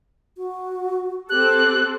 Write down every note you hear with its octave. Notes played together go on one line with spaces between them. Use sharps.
F#4
C4 G4 A4 F#6